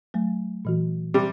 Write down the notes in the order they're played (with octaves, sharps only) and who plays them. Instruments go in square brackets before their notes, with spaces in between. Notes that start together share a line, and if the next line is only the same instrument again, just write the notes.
[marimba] F#3 A3
A#2 E3 F#4
[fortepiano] C3 G3 [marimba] D6